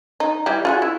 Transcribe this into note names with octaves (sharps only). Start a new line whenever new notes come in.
D#4
E3 G3 E4
F4 F#4 G#4
E4